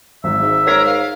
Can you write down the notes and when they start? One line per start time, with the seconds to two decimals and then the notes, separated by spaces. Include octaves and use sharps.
0.24 G#1 E5
0.42 G#2
0.67 A#4 C#5 G#6 B6
0.86 F5